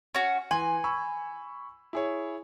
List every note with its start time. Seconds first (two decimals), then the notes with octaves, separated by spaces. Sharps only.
0.15 C#4 F#4
0.51 E3 G#5 C6 F#7
0.84 B5 C#6 E6
1.93 E4 G#4 C#5